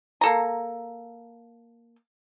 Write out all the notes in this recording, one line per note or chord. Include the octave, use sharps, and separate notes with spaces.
A#3 A4 A#5